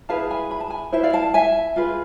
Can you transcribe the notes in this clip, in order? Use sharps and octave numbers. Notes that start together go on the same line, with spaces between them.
E4 G#4 B4 F5 A5
G#5 B5
B5
A5
G#5 B5
E4 B4 C5 E5
D5 F5
F5 A5
E5 G#5
F4 G#4 B4